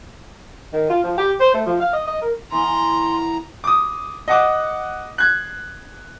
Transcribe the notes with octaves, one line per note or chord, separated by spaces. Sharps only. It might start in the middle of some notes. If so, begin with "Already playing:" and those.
D#3
F4
F3
G4
C5
A3
F3
F5
D#5
D#5
A#4
E3 B3 A#5 C6
D6 D#6
D#5 F#5 D6
F#6 G#6